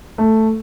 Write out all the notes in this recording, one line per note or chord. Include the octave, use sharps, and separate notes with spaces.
A3